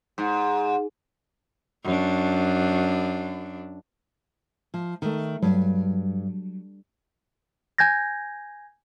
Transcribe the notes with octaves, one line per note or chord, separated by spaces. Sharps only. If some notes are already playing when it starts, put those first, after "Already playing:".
G#2
F#2 D4
F3
D#3 A3
G2 F#3
G#5 G6 G#6 A#6